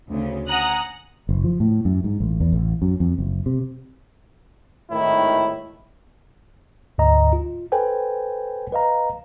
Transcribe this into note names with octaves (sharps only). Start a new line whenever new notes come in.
D2 C#3
F#5 G#5 A#5 D#6 F#6
F#1
F3
A2
F#2
G#2
A1
E2
A1
F#2
F2
F#1
C3
G#1 A2 D#3 E4
D2 G#2 D3 D#5 A#5
F4
A4 B4 C5 G5 G#5
B4 D#5 F5 A#5